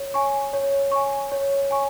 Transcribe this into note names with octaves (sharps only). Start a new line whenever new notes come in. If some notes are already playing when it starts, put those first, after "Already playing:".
Already playing: C#5
G#5 C#6
C#5
G#5 C#6
C#5
G#5 C#6